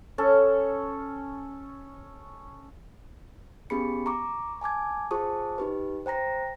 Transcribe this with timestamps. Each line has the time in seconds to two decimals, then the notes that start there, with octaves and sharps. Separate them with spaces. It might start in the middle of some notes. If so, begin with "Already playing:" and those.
0.18 C#4 A4
3.70 B3 C#4 G4 G#4 B5 C#7
4.06 A#5 C#6 D6
4.61 G#5 A5 D6 G#6
5.11 F4 G#4 C5 A5 C#6 D#6
5.58 D#4 G4 B4
6.06 C5 G5 A#5 A#6